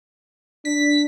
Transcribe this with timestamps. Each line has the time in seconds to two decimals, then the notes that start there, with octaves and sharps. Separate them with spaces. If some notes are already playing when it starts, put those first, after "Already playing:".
0.65 D4 B6